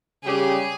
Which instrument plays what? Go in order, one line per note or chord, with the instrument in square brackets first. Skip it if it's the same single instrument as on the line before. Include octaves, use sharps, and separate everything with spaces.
[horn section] C#3 G3 C#4 G4 [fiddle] G#4